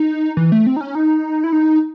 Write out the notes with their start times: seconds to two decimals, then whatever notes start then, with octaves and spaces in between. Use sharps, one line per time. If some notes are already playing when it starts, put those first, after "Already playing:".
Already playing: D#4
0.37 E3
0.52 A3
0.66 C4
0.76 D#4
0.81 C#4
0.95 D#4
1.44 E4
1.52 D#4